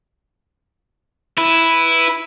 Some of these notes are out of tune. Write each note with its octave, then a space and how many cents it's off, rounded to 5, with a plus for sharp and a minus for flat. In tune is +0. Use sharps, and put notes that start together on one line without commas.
E4 +0 B4 +0